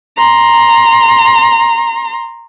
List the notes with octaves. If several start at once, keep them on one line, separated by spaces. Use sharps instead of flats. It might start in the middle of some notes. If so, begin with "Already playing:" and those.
A#5 C6